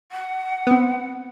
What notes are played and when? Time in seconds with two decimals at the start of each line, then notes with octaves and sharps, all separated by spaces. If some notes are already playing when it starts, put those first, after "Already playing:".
0.12 F#5
0.67 B3 C4